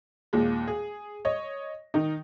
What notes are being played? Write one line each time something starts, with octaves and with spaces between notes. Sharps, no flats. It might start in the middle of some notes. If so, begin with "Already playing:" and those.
D#2 A#2 G#3
G#4
C#5 D#5
D#3 D#4